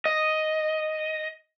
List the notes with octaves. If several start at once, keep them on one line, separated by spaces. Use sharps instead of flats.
D#5